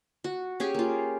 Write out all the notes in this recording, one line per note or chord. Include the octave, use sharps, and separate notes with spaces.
F#4
C#4 G4 G#4
A#3 F4